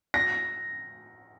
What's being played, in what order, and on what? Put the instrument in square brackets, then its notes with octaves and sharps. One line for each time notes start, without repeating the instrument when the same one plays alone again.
[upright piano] A#6